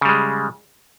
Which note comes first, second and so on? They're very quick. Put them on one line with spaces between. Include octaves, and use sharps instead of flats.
C#3 G3 G#3